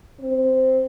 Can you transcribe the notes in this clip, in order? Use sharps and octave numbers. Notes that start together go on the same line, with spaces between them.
C4